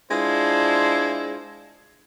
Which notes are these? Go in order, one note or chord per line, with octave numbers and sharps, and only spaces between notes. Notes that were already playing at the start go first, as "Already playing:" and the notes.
G#3 D4 E4 F4 C5